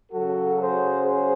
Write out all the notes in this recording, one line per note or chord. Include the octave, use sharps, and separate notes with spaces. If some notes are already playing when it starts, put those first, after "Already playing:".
C#3 F#3 F#4 A4
G#4 C5
G#4 C5